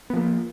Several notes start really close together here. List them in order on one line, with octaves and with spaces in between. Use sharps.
B3 F3 A#3